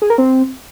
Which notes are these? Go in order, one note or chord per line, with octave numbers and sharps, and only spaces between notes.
G#4
A#4
C4